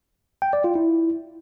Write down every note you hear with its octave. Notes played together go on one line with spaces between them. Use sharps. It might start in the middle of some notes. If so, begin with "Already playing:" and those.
G5
D5
F4
E4